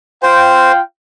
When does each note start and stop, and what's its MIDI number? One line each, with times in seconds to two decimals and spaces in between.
0.23 0.81 65
0.23 0.72 72
0.23 0.81 77
0.23 0.81 79